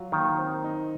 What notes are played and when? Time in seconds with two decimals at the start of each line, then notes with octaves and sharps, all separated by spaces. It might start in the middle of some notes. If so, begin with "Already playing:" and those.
Already playing: F#3 F4
0.12 D#3 A#3
0.38 C4
0.64 D#4